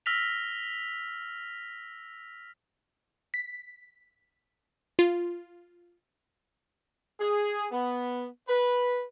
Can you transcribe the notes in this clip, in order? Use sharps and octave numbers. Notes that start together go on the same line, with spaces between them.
E6 F6 A#6 B6 F7
B6
F4
G#4
B3
B4